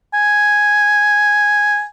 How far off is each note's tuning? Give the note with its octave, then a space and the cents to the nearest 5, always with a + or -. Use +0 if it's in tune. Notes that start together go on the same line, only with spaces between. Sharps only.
G#5 +0